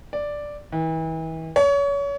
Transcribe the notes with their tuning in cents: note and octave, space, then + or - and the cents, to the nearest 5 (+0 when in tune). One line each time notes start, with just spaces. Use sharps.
D5 +0
E3 -35
C#5 +30